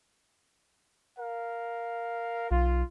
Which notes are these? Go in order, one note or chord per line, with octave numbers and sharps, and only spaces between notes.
A#4 F5
B1 F4